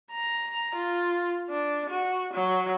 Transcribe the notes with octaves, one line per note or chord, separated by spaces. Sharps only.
A#5
F4
D4
F#4
F#3